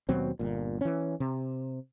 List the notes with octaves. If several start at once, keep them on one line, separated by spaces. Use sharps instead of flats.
D#2 B2 F#3 C4
G1 A#2
E3 C#4
C3